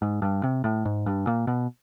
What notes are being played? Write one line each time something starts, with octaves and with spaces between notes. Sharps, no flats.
G#2
G2
C3
A2
G#2
G2
A#2
B2